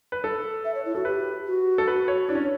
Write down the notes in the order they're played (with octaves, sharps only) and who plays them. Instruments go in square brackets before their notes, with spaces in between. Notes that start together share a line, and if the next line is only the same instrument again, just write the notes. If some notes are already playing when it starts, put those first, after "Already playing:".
[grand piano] B4
A4
[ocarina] E5
C#5
E4
[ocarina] F#4 [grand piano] A4
[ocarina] G4 [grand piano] B4
[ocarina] F#4
[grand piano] A4
B4
C#5
[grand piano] D4 [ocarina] E4
[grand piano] C#4